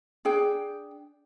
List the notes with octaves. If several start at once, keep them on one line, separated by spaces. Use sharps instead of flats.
D4 G#4 G5